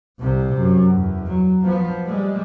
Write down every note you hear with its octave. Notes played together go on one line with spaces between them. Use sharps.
C2 C3
F#2
E2
F#3
F3 B3
G3 G#3